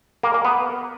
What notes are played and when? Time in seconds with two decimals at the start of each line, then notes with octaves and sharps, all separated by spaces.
0.23 A#3
0.34 A#3
0.45 B3